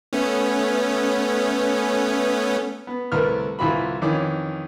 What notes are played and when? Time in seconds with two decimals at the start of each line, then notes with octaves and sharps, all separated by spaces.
0.13 A3 B3 C#4
2.87 B3
3.12 C2 A3 A#4 B4 F6
3.59 C2 E3 F4 F#4 B5
4.02 F2 D#3 E3 C#4 D6